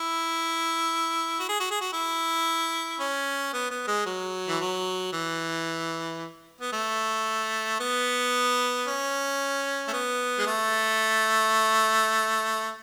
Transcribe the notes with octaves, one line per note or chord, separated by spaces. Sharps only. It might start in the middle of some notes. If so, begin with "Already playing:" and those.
Already playing: E4
F#4
G#4
F#4
G#4
F#4
E4
C#4
B3
B3
G#3
F#3
E3
F#3
E3
B3
A3
B3
C#4
A3
B3
G#3
A3